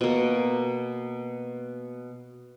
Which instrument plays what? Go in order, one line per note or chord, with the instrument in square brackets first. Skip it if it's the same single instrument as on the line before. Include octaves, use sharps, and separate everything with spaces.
[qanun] B2 A#3